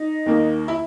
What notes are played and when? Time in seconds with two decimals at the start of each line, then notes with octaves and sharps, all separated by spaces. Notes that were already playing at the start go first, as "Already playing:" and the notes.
Already playing: D#4
0.26 D#2 D#3 A#3
0.68 E4